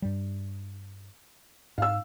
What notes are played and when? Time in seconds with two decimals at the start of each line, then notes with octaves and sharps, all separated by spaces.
0.02 G2 G3
1.78 G#2 F5 E6